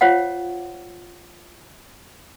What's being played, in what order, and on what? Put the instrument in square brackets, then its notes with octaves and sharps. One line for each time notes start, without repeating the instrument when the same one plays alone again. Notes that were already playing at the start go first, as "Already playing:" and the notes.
[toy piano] F4 C5 C#5 F5 F#5